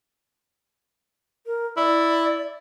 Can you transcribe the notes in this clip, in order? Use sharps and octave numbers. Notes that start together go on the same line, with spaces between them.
A#4
E4 D5